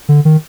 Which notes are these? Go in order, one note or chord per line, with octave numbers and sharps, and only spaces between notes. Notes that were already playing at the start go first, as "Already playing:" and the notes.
D3
D#3